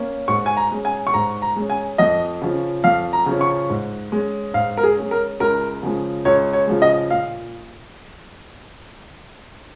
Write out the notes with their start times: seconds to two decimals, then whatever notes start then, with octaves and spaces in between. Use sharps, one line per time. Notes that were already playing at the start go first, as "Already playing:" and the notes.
Already playing: A#3 C#4
0.28 G#2 C#6
0.46 G#5
0.57 A#5
0.71 G#3 C#4
0.85 G#5
1.07 C#6
1.14 G#2 A#5
1.42 A#5
1.56 G#3 C#4
1.70 G#5
1.98 F2 D#5
2.42 C#3 F3 C#4
2.84 F2 F5
3.13 A#5
3.26 C#3 F3 C#4
3.41 C#6
3.70 G#2
4.12 G#3 C#4
4.54 G#2 F5
4.77 A#4
4.83 G#4
4.96 C#4
5.02 G#3
5.11 A#4
5.40 C#2 A#4
5.83 C#3 F3 G#3
6.25 C#2 C#5
6.53 C#5
6.67 C#3 F3 G#3
6.82 D#5
7.10 A#2 F5